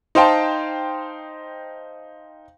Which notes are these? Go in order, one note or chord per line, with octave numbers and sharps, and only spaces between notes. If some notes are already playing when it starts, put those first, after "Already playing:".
D#4 C5 F5 G5 A5